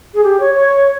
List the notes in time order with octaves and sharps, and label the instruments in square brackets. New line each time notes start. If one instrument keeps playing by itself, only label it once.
[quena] G#4
G4
C#5
C#5